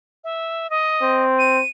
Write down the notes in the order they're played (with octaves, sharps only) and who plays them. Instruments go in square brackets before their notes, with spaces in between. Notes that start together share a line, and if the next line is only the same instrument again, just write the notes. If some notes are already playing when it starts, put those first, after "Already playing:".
[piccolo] E5
D#5
[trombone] C4
[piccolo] D#7